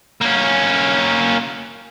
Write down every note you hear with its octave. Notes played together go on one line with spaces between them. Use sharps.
A#3 C#4